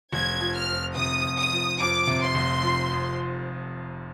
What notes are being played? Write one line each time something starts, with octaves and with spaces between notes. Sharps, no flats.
F1 G#6
F3
F6
F2
C3 D#6
F1
D#6
F3
F2 D6
C3
C6
F1
F3
F2